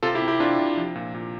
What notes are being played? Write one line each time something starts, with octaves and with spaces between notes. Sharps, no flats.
C3 F4 A4
E4 G4
C3
E4 G4
C3 D4 F4
C3
F3
A#2
A#2